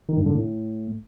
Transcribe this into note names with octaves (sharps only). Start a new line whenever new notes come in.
D#3
G2
D3
A2